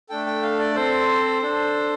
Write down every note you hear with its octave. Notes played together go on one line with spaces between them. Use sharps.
A3 D4 A4 G5
G5
F5
D5
C4 A4 C5
D4 A4